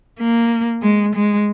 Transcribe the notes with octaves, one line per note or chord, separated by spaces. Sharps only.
A#3
G#3
G#3